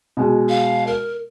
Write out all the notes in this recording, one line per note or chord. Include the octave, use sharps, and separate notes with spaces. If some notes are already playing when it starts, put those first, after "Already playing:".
B2 G#3
F5
A#4